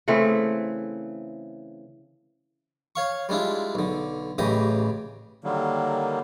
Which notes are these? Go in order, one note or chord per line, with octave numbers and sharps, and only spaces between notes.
C#3 E3 A3 C4
C#5 F5 C#6
G3 G#3 D4 E4 F4
B1 D3
A1 C#3 E3 G4 D#5 D#6
D3 D#3 F#3 G3 A#3